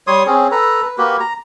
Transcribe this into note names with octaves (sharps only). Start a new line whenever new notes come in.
G3 C#5 C6 D#6
C4 C#4 G#4
A4 B4 A#5
B4
A#3 F#4 G4 B4
A#5